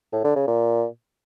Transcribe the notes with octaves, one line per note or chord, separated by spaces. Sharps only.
A2
D3
C#3
A#2